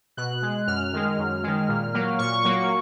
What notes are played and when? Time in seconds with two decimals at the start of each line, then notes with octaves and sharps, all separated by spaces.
0.17 B2 F#6
0.42 G#3
0.67 F#2 F6
0.93 D#3 G#3
1.18 F#2
1.43 D#3 G#3
1.68 A#2
1.94 F#3 A#3
2.19 A#2 C#6
2.44 F#3 A#3